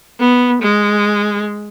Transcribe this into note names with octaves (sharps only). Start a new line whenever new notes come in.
B3
G#3